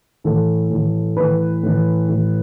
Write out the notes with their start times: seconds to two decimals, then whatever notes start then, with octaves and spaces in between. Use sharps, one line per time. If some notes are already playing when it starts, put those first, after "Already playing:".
0.24 A2 E3 A4
0.71 A2 E3
1.17 A2 E3 B4
1.63 A2 E3
2.09 A2 E3